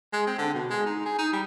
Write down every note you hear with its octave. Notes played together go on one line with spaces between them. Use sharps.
G#3
C4
D3
B2
G#3
D#4
G#4
D#4
G3